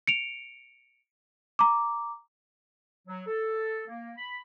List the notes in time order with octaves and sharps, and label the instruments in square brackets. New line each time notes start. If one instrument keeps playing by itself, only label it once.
[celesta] C#7 D7 F7
A#5 D6
[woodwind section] F#3
A4
A#3
B5